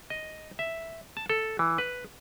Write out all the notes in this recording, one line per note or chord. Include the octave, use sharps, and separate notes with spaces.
D#5
E5
A5
A4
E3
B4